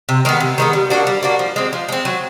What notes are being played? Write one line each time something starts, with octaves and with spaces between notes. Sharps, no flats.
C3
D#3 G#3 B3
C3
D#3 G#3 B3
G3
A#3 D4 F#4
G3
A#3 D4 F#4
F3
G#3 C4
F3
G#3 C4
F#3